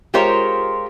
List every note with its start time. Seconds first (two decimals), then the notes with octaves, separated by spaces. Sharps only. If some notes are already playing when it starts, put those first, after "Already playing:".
0.14 G#3 F4 G4 A#4 C5 C#5